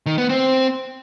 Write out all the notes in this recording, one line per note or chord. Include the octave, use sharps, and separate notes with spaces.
D#3
B3
C4